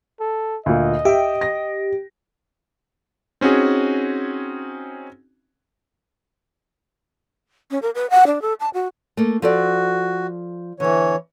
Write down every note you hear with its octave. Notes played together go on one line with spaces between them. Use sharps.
A4
D2 A#2 D#5
G4 E5 G5
A#6
C4 C#4 D#4 F#4 G#4
C#4
A#4
B4
F#5
D4
A4
A5
F#4
A3 A#3
F3 F#4 A4 D5
E2 D3 E3 C#5